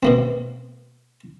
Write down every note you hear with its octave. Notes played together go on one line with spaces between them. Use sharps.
B2 A#3 C4